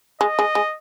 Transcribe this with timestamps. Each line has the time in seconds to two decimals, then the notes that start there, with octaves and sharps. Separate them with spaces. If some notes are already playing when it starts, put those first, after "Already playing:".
0.21 G#3 D#5
0.39 G#3
0.55 G#3